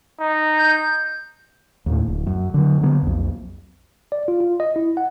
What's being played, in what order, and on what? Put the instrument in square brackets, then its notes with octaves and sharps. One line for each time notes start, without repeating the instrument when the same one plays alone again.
[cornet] D#4
[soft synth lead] G6
[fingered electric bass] D#2 A2
D1
F#2
D3 F#3
D3 A#3 B3
B1 F2
[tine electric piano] D5
F4
F4
D#5
E4
F#5